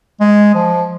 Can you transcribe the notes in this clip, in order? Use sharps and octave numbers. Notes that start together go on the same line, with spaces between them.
G#3
F3